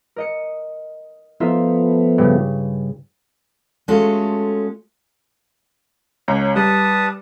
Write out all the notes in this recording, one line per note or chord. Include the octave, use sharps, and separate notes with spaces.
A#4 D#5 C#7
F3 A3 B3 D#4 F4 E5
G2 C#3
G#3 A3 C#4 F4 F#4 A4
C#2 C#5 A#5
G3 B4 A5 D#6